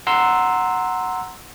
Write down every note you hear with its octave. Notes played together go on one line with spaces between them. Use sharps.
F#5 A#5 C6 E6